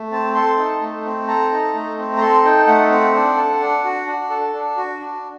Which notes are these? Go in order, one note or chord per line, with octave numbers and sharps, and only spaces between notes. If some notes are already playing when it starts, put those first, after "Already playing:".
Already playing: A3
C4 A5
A4 C6
D#4
A3
C4
A4 A#5
D#4
A3
C4
A#5
A4 C6
D#4 G5
A3 F#5
C4 F#5
D4
A4
D4
F#4
D4
A4
D4
F#4
D4